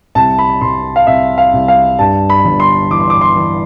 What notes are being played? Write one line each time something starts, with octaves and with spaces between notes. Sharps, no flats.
C2 A5
B5
C2 C6
F5
C2 E5
F5
C2
F5
G2 A5
B5
G1
C6
E3 D6
C6
D6
C6
E3